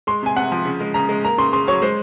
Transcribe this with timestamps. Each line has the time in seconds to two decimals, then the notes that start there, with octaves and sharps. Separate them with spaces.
0.07 G#3 C6
0.23 C3 G#5
0.36 C3 F#5
0.52 F3
0.65 C#3
0.80 G#3
0.94 C#3 A#5
1.09 G#3
1.24 A#3 A#5
1.38 C#3 C6
1.53 C#3 C6
1.67 F#3 C#5
1.82 G#3 C5